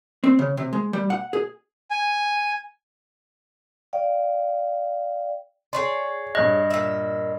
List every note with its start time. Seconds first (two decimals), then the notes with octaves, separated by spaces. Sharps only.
0.24 C4
0.39 C#3
0.57 C3
0.73 G#3
0.93 G3
1.10 F#5
1.33 G#4
1.91 G#5
3.93 D5 F5 G5
5.73 G#4 C#5 D5 C6
6.35 G2 D#5 F#6
6.70 A#2 E5